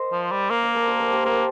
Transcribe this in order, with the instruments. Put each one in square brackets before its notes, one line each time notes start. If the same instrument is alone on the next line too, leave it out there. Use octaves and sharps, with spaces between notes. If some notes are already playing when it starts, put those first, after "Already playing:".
Already playing: [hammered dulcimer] A#4 C5 D#5
[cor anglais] F3
G3
[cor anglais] A#3 [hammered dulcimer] A#4 D5
[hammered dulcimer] A#4 D5
A4 C5
G4 A#4
A4 C5
G4 A#4
[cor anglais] A#3 [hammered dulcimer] A4 C5